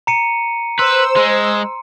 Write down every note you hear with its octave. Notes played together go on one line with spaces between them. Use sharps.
A#5 C#7 D#7
B4 C5 C6 E6
G#3